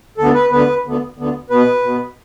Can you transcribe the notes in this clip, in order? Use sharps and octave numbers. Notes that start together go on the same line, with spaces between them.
D2 D3 B3 A4
B4
D2 D3 B3 B4
D2 D3 B3
D2 D3 B3
B2 B3 B4
B2 B3